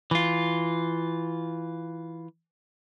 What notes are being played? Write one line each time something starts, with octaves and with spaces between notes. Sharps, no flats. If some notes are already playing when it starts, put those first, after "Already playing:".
E3 F4